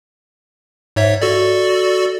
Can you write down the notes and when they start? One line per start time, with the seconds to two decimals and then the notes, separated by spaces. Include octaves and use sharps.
0.96 G#2 C#5 E5
1.22 F#4 A4 D5